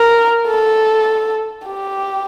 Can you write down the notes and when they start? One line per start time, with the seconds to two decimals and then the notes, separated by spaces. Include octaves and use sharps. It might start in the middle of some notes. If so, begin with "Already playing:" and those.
Already playing: A#4
0.47 A4
1.67 G4